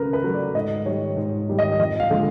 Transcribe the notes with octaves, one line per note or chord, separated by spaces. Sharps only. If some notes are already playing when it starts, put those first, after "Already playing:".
Already playing: C#3 F#3 A3 A#4 B4
B4
F#3 A3
D5
G#2 D#5
D#3 G3 C#5
G#2
D#3 G3
D#5
F2 D#5
F5
D3 F3 G#3